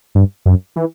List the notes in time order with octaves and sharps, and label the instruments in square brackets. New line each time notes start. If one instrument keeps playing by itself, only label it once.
[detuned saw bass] G2
F#2
E3